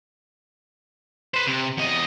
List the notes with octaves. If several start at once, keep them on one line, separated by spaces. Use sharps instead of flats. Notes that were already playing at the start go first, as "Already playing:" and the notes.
B4 C5
C3
E2 D#5